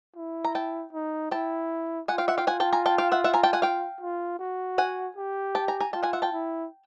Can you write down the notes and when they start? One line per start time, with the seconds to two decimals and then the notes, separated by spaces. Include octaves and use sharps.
0.16 E4
0.44 A#5
0.55 G5 A5
0.93 D#4
1.31 E4 G5 A5
2.08 F4 F#5 G#5
2.18 F5 G5
2.28 E5 F#5
2.38 F5 G5
2.47 F4 F#5 G#5
2.60 G5 A5
2.73 G#5 A#5
2.86 G5 A5
2.98 F5 G5
3.12 E5 F#5
3.24 E5 F#5
3.34 G#5 A#5
3.43 G5 A5
3.53 F#5 G#5
3.62 F5 G5
4.01 F4
4.39 F#4
4.78 F#5 G#5
5.17 G4
5.55 G5 A5
5.68 G#5 A#5
5.80 G#5 A#5
5.93 F4 G5 A5
6.03 F#5 G#5
6.13 E5 F#5
6.22 G5 A5
6.33 E4